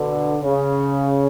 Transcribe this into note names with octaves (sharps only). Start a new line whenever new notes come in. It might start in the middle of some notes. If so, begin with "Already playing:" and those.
Already playing: B2 D3
C#3